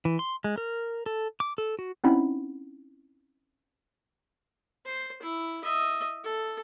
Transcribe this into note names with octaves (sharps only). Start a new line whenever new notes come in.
E3
C6
G#3
A#4
A4
D6
A4
F#4
C4 C#4 D#4 E4 F#5 B5
C5
E4
D#5 E5
A4